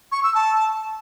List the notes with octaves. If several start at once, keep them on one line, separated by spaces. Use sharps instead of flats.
C#6
E6
A5